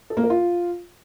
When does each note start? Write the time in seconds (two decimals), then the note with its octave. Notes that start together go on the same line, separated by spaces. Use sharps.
0.10 A4
0.17 A#3
0.23 A#4
0.30 F4